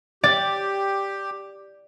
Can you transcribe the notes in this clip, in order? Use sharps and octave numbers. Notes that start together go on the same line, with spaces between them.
G4 D5